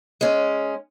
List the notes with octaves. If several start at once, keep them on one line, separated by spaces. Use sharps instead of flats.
G#3 C#4